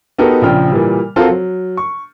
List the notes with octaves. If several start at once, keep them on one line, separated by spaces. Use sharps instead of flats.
B3 D#4 F#4 G4 A4 A#4
A#1 C#3 F3 G5 F6
A#2 E3 G3
C4 F4 F#4 A4 A#4 C5
F#3
C#6